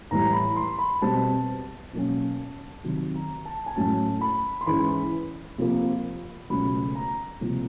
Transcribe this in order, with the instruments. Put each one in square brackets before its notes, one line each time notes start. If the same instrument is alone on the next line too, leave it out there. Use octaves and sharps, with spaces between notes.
[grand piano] A2 E3 G3 A#5
B5
C6
B5
B2 G3 C4 A5
B2 F#3 A#3 C#4
C3 D#3 F#3
A#5
A5
G#5
A2 F#3 A3 C#4 A5
B5
C6
G#2 E3 G#3 C#4 B5
C3 F3 A#3
C#2 B2 F#3 A3 C#4 B5
A#5
C2 A#2 F3